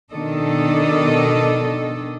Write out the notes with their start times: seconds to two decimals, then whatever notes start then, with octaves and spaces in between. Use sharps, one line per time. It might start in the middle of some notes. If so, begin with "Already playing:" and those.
0.11 B2 D#3 D4 A4 D#5